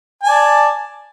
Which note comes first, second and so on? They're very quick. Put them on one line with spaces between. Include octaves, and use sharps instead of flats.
G#5 A5 D5